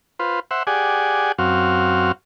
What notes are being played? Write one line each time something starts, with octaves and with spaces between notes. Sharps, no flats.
F4 B4 C5
C5 E5 F#5
G4 G#4 D5 F#5 G#5
F#2 C4 F#4 F5